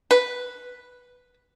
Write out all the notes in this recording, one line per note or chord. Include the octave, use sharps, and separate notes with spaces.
B4